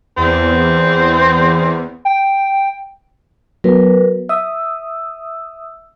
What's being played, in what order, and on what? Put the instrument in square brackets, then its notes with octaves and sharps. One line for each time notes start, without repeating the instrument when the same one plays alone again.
[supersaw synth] E2 [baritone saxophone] C4
[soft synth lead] G5
[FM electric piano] F#3 B3 [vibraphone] A#4 B4
[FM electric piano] E5 D#6 [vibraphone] E6